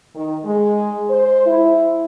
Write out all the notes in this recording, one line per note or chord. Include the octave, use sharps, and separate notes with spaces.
D#3
G#3
C5
E4